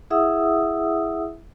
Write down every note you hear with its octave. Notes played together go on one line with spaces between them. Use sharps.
E4 G#4 E5 F#5 D#6 E6